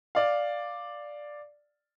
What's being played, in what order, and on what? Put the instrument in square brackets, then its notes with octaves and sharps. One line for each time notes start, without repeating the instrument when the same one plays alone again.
[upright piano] D5 F5